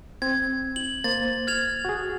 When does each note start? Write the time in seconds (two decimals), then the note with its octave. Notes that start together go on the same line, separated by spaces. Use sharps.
0.22 C4 G#6
0.76 F#7
1.04 A#3 C5 A6
1.47 F6 G#6 F7
1.85 F#4 G#4